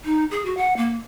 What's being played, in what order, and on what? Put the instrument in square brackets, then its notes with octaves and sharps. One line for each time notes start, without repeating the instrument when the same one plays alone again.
[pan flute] D#4
G#4
F#4
F#5
A#3